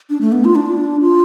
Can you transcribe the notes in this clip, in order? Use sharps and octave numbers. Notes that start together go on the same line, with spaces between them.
D4
A3
B3
F4
D4
F4